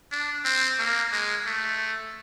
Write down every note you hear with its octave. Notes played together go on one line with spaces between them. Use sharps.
D4
C4
A#3
G#3
A3